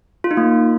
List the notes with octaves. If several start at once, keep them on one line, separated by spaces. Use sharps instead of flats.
F4
D#4
A#3